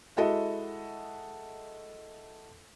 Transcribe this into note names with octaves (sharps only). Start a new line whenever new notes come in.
G#3 E4 F#4 A4 D#5 E5